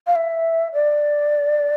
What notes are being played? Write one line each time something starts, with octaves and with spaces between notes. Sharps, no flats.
F5
E5
D5